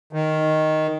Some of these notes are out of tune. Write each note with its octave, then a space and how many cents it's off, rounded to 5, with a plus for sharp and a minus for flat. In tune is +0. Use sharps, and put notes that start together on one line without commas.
D#3 +0